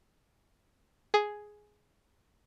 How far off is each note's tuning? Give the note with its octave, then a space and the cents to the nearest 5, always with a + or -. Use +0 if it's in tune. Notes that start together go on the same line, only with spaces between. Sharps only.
G#4 +5